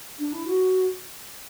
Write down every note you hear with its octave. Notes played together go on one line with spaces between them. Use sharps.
D4
E4
F#4